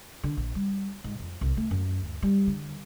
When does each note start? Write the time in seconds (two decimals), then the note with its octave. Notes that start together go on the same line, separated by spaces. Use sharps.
0.24 D3
0.37 A#1
0.55 G3
1.04 G#2
1.20 F2
1.41 C2
1.57 A3
1.71 F#2
2.03 D2
2.23 G3
2.47 D3